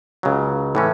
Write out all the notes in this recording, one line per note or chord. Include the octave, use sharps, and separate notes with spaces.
C#2 C#3 F#3
A2 E3 C#4